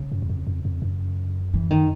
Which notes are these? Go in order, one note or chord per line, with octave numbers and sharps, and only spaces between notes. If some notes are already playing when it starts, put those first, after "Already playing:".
Already playing: C#3
F#2
E2
F2
F2
F2
F#2
E3
D#3